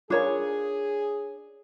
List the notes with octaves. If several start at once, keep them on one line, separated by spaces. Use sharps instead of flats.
D4 F4 G#4 A#4 C#5